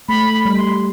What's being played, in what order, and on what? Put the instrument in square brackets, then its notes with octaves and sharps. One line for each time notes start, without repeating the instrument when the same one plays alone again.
[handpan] A3 [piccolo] B5
[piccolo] B5
[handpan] G3
[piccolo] C6